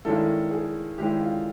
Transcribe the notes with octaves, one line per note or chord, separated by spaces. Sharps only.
G2 D#3 G#3 C#4 E4 A4
G#4
G2 D#3 G#3 C#4 E4 G4
F4